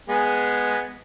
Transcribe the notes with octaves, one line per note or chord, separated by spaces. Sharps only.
G#3 B3 G#4